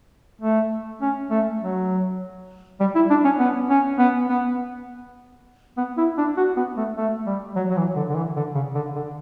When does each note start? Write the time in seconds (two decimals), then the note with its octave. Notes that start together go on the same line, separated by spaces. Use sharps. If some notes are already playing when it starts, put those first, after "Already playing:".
0.42 A3
1.02 C#4
1.31 A3
1.61 F#3
2.80 G3
2.95 E4
3.10 D4
3.25 C#4
3.39 B3
3.70 C#4
3.98 B3
4.29 B3
5.77 B3
5.97 E4
6.18 D4
6.37 F#4
6.57 B3
6.77 A3
6.97 A3
7.26 G3
7.56 F#3
7.70 F#3
7.77 E3
7.96 D3
8.10 D3
8.16 E3
8.36 D3
8.55 C#3
8.75 D3
8.96 D3